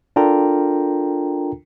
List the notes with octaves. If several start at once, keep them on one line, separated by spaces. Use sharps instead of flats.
D4 F4 A4 A#4 G5 A#5